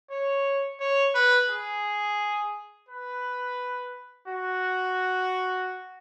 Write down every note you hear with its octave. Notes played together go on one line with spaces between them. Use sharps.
C#5
C#5
B4
G#4
B4
F#4